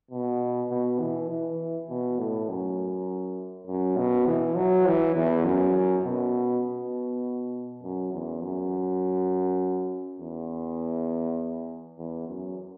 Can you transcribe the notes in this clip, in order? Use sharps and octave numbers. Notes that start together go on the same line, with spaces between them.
B2
B2
E3
E3
B2
A2
F#2
F#2
B2
E3
F#3
E3
E2
F#2
B2
B2
F#2
E2
F#2
E2
E2
F#2